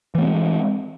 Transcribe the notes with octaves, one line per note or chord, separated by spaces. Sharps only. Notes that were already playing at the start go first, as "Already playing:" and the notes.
E3 G#3 A3 C4